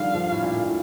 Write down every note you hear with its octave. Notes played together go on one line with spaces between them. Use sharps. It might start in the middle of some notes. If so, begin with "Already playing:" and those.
Already playing: D3 D#3 F3 G3 F5
D3 F3
A2
A#2
A2